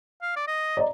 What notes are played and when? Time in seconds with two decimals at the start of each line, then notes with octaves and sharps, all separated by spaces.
0.22 F5
0.36 D5
0.48 D#5
0.77 D5 D#5 A#5